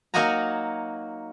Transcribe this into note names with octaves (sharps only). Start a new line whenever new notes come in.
F#3 A#3 D#4 F#4 G#5 A#5